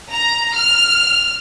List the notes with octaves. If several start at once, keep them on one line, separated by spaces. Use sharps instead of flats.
A#5
F6